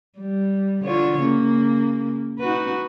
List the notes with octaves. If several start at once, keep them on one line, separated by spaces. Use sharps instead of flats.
G3
D3 F4 C#5
C#3 A#3
D#4 F#4 B4